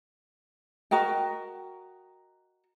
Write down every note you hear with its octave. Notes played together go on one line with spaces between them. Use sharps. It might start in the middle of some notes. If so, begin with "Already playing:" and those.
F#4 A#4 D#5 G5